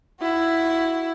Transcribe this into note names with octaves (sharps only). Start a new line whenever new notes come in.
E4 F#4